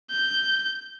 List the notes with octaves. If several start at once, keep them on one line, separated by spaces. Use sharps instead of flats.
G6